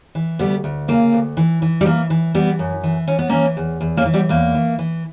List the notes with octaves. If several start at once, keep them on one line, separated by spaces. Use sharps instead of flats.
E3
D2 G3 B3
D2
C#3 A#3
D2
E3
E3
G3
E3 A#3
E3
E3 G3 B3
F#2
E3
E3 C#4
B3
E3 A#3 C#4
E2
E2
A#3 C#4
E3
G3 B3
E2 A#3
E3
E3